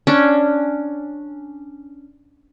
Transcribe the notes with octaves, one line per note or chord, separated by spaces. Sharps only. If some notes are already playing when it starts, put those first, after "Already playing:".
C#4 D4